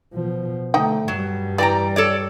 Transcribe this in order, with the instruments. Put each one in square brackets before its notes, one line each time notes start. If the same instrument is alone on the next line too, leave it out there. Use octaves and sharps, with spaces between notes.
[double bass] B2 F3
[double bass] D3 A3 [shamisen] D#4 G5
[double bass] G2 G3 [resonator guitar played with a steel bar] F#3
[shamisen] E3 [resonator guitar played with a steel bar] D5 G5 A#5
[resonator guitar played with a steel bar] A4 C#5 D5